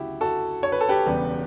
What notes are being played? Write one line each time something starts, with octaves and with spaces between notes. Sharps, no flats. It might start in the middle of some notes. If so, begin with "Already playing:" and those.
Already playing: D2 C#3 F#3 A3 E4 F#4 G4
F#4 A4
C#5
B4
A4
G4 B4
E1 E2 C#3 G3 B3